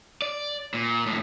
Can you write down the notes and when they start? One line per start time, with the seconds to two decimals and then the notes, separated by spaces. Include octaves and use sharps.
0.22 D5
0.74 A#2
1.06 F2 A2